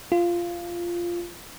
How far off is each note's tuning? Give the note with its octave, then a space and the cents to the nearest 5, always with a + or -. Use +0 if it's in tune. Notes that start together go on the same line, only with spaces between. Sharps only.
F4 -10